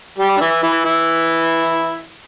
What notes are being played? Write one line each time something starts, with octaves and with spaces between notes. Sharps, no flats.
G3 G4
D4
E3 E4
E3 E4
E3 E4